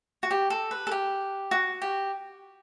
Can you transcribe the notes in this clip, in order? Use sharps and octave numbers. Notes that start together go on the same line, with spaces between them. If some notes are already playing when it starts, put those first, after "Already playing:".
F#4
G4
A4
B4
A4
G4
F#4
G4